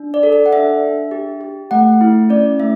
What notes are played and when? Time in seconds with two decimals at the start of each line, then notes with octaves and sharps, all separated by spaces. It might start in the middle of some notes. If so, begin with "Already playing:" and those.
Already playing: D4
0.14 D5
0.23 A4
0.32 D5
0.46 F#5
0.53 D4 E5
0.82 D4
1.11 G4
1.41 G4
1.71 A3 F#5
2.01 E4
2.29 C#4 D5
2.59 A3 E5